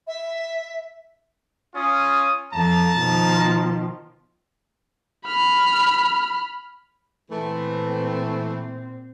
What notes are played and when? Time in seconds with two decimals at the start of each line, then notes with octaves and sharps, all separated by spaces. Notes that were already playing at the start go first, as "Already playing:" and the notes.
0.07 E5
1.74 C#4 F4 D#6
2.53 F2 A5 A#5
2.95 B2 D#3 F3
5.26 B5 F6
7.31 A#2 E3 A3 C4